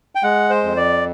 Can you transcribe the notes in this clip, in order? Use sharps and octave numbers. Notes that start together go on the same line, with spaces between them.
G5
G#3 F#5
C5
F2
D5